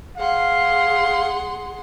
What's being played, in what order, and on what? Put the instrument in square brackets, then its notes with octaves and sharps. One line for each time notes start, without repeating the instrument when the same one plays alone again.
[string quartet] G#4 F#5 C6 [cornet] F5